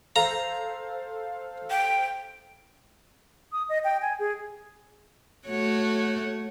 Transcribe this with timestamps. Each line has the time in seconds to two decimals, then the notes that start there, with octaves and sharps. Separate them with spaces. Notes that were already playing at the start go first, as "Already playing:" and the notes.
0.16 A4 C5 F5 A#5
1.70 G5
3.52 D#6
3.69 D#5
3.84 G5
4.02 G#5
4.19 G#4
5.47 A3 F#4 C#5